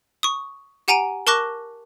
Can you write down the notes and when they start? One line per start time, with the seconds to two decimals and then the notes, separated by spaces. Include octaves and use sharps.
0.23 C#6 D#6
0.88 G4 F#5 G#5 A#5 D7 D#7
1.27 A#4 A5 C#6 D6 F#6 A#6